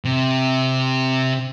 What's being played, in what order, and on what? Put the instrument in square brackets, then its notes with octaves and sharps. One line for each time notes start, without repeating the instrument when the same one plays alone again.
[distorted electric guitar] C3